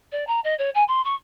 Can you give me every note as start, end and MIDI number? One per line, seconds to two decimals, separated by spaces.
0.12 0.27 74
0.27 0.40 82
0.44 0.54 75
0.59 0.70 73
0.75 0.84 80
0.88 1.03 84
1.04 1.15 85